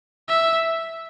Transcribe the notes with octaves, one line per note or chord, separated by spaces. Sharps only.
E5